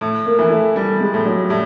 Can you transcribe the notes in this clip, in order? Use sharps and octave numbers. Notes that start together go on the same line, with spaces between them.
A2
A#3
E3
A3
G3 A3
G#3
A2
F#3
A2 G3